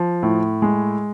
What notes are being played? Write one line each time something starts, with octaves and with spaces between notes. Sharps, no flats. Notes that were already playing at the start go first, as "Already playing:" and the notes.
Already playing: F3
A2
G#3